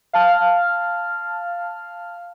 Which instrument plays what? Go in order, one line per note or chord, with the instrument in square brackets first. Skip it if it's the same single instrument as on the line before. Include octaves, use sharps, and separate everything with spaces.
[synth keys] F5 A5 F6